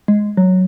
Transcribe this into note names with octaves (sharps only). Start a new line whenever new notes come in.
G#3
F#3